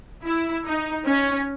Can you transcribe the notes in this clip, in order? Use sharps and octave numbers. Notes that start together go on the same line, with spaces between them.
E4
D#4
C#4